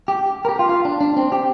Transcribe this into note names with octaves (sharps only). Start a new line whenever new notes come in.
G4
A#4
G4
F4
F4
D4
D4
C4
G4